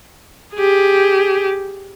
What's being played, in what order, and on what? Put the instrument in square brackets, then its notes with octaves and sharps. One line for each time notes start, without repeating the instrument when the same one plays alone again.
[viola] G4 G#4